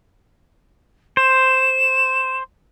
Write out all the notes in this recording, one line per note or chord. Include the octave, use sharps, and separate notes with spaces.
C5 E7